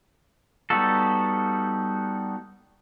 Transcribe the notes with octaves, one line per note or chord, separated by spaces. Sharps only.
G3 B3 D#4 F#4 A4